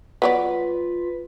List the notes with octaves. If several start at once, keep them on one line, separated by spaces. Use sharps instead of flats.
F#3 B3 F4 B4 D5